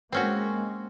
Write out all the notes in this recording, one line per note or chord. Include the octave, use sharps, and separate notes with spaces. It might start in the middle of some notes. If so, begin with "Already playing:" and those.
G#3 A#3 C4 C#4 F#4